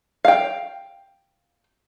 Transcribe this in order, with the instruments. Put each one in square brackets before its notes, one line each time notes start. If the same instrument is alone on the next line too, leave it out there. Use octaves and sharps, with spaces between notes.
[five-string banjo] F5 G5